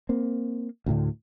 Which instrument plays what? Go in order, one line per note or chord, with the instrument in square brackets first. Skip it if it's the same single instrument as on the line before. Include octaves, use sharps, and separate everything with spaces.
[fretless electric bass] A#3 C4
D2 A2 D3